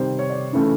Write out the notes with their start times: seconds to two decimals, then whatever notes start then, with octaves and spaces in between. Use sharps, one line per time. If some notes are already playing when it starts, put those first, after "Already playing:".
Already playing: C3 D#3 G3 C5
0.19 C#5
0.30 D5
0.53 C#3 E3 A3 C#4